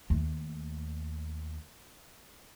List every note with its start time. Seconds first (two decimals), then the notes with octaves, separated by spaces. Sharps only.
0.10 D#2 A3